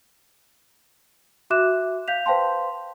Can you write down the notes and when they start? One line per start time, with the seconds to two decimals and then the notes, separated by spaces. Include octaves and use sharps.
1.50 F#4 E5 D6 F#6 E7
2.08 F5 G6 B6 F7
2.26 B4 C5 F5 G5 A5 C6